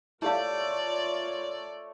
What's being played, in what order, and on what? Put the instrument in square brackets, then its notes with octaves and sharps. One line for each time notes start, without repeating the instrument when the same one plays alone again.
[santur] A3 [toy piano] E4 G4 F5 [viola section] F4 A#4 C#5 [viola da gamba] D5